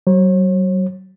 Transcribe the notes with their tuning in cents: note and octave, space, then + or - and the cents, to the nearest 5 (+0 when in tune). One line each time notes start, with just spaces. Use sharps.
F#3 +35 C#5 -40